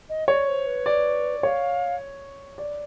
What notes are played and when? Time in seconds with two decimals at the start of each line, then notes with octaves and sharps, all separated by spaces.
0.09 D#5
0.28 C#5 D5
0.48 C5
0.67 B4
0.86 D5
1.43 C#5 F5
2.58 D5